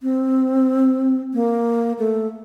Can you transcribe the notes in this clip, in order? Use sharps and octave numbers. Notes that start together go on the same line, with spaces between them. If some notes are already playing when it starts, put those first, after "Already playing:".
C4
A#3
A3